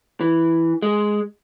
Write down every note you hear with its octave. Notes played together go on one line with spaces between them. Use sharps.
E3
G#3